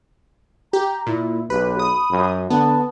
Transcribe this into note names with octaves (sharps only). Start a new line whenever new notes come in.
G4 A#5
A#2 E4
B1 G4 B4
B5 D#6
F#2
D3 B3 A5